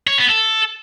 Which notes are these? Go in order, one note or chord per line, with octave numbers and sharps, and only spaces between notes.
C#5
B3
A4